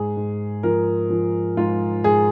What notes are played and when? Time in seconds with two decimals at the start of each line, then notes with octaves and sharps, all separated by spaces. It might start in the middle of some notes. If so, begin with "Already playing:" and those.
Already playing: G#2 G#4
0.17 G#2
0.63 F3 A#4
1.10 F3
1.57 G#2 F4
2.04 G#2 G#4